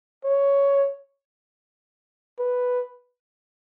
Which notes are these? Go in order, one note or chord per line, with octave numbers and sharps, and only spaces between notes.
C#5
B4